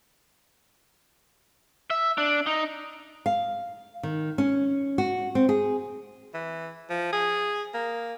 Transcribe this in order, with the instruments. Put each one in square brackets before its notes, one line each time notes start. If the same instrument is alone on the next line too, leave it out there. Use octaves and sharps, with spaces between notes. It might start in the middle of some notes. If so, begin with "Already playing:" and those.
[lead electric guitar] E5
D4
D#4
[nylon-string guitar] F5
D#3
C#4
F#4
C4
G#4
[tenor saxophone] E3
F3
G#4
A#3